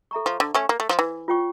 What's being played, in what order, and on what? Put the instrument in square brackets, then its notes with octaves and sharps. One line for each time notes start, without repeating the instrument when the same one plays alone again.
[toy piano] A4 E5 A#5 C#6
[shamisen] F3
D3
A3 C#4
A#3
A3
F3
E3
[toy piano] F4 C#5 G5 C#6